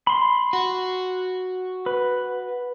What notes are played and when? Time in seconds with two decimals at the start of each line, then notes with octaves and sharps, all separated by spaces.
0.07 B5 C6
0.53 F#4
1.86 B4